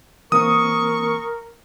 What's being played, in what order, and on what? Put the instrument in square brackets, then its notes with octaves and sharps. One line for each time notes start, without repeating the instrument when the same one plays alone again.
[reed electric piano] E3 A#3 C4 [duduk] A#4 [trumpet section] C#6 [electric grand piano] D#6